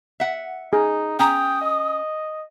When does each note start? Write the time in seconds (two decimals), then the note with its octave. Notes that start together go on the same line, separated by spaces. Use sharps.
0.20 E5 F#5
0.73 D#4 G#4
1.19 C#4 G5 A#5 D#6
1.62 D#5